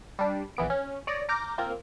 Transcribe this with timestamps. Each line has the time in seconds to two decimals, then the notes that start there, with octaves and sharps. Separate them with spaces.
0.19 G3 D4
0.57 A#1 E3 B3 D7
0.70 C#4
1.07 C#5 D5 D#6 A#6
1.29 A#5 D6 F6 G6 A#6
1.58 A#3 C4 F4 A#4